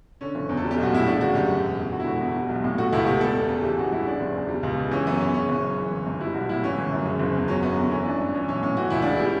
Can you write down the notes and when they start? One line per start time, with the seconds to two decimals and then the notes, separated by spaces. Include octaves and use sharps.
0.21 D3 C#4
0.35 F#1
0.49 E2
0.57 A4
0.64 G3
0.71 G4
0.78 B1 F#4
0.92 A2 E4
1.07 C#3 D4
1.21 G1 F#4
1.35 F#2 G4
1.49 C#3
1.64 E1
1.79 E2
1.92 D3 F#4
2.00 E4
2.06 E1 F#4
2.21 E2
2.36 G3
2.49 B1
2.64 A2
2.78 A3 F#4
2.93 C#2 E4
3.06 B2 G4
3.21 G3 A4
3.34 E2
3.49 C#3
3.63 E3 G4
3.78 A1 F#4
3.92 G2 E4
4.07 C#3 D4
4.20 F#1
4.35 E2
4.49 G3
4.63 C#2
4.78 C#3
4.91 E3 C#4
5.06 F#2 B3
5.20 C#3 C#4
5.34 C#3 C#4
5.49 F#1
5.63 F#2
5.77 E3
5.91 G1
6.06 G2
6.21 G3 E4
6.34 B1 F#4
6.49 A2 E4
6.63 E3 C#4
6.78 G1
6.92 F#2
7.06 C#3
7.19 F#1
7.34 E2
7.48 F#3 C#4
7.63 F#2 B3
7.76 D3 B3
7.91 E3 C#4
8.05 A1 D4
8.20 G2 D4
8.34 E3 C#4
8.48 B1 C#4
8.62 A2 C#4
8.77 E3 F#4
8.90 C#2 E4
9.02 C#3 D4
9.16 G3 E4